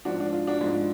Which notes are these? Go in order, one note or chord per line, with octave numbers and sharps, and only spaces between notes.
G#2 F3 D4 F#4
D4
F4
D4 F#4
G#2 F3